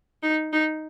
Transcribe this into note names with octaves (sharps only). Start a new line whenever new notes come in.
D#4
D#4